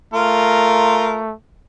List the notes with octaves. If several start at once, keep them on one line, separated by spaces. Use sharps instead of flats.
A3 F4 A#4